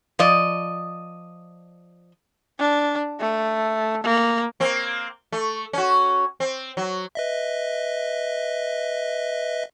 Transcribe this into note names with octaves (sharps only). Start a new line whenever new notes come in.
F3 D5 D#5
D4
A3
A#3
A#3 C4
A3
C#4 F#4
C4
F#3
B4 D#5 E5